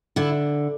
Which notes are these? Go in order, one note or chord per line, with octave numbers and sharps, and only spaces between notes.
D3 E4